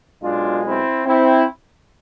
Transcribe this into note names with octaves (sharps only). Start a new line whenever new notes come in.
B1 B2 G#3 D4 F4
C4 E4
C4 E4